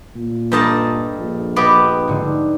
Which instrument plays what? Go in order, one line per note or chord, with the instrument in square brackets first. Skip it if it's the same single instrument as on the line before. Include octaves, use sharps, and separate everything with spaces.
[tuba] A#2
[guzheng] G2 D#5 A5 [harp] A4 A#4 G5
[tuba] A#1
[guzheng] B3 G4 [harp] D#5 D6
[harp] G#2 D3